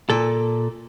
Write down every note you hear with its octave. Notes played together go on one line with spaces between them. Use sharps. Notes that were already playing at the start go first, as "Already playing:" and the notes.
A#2 A4